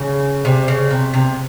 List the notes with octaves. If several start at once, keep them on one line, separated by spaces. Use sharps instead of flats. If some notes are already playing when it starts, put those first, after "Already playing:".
Already playing: C#3
C3
C#3
C3
C3